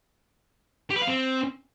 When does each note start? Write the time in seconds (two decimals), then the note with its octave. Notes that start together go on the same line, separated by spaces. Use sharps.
0.90 G4
0.96 B4
1.02 F5
1.07 C4